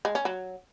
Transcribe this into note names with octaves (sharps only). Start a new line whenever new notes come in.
G#3
C#4
F#3